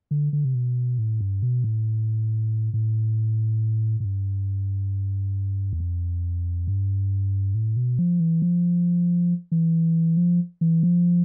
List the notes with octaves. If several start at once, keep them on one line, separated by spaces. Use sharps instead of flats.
D3
D3
C3
B2
A2
G2
B2
A2
A2
A2
G2
E2
F2
G2
A2
B2
F3
E3
F3
E3
F3
E3
F3